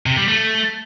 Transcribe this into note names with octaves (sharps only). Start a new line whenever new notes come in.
C3
G3
A3